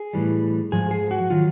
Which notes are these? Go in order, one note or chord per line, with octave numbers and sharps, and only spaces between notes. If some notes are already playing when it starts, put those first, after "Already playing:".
Already playing: G#4
A2 E3 G3
G#2 F3 G#4
G#4
F#4
D#3 F#3 F4